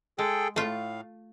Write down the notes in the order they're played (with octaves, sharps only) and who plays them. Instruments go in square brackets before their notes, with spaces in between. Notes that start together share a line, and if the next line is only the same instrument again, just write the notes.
[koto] G#3 [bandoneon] G#4 A4 G5
[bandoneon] A2 F5 [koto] A3 F4